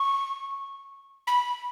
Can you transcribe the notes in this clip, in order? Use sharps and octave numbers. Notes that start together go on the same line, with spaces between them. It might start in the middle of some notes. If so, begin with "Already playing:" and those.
Already playing: C#6
B5